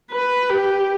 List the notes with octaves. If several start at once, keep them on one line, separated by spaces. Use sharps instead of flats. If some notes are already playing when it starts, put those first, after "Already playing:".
B4
G4